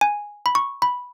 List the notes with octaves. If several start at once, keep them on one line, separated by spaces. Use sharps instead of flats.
G#5
B5
C#6
B5